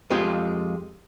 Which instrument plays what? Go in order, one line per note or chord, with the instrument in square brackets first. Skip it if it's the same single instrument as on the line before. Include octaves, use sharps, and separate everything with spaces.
[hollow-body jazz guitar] F2 G#3 F4 G4